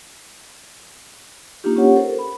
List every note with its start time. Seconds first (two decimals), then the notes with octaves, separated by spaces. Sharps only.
1.64 A#3 D4 D#4 F4 G4
1.76 C#4 G4 C#5 F#5
1.96 A4 A#4 C5
2.19 B5